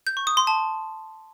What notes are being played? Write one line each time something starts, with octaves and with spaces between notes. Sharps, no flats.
G6
C#6
D#6
C6
A5